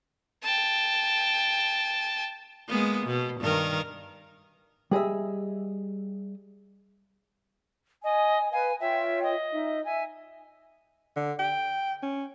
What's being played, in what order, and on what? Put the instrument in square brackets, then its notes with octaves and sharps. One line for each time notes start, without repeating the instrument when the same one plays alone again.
[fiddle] G5 A5
[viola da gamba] G#3 A#3 B3
B2
G2 D#3 A#4
[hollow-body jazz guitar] G3 G#4 D#5 E5
[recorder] D#5 [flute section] G#5
[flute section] B4 F5 [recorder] G#5
[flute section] F4 C#5 G5 [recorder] E5
[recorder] D#5
[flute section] D#4 E5
[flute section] E5 [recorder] G#5
[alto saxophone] D3
G5
C#4